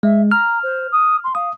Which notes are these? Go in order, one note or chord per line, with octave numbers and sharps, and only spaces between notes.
G#3 E5
A#5 F6
C5
D#6
C6
F5 D#6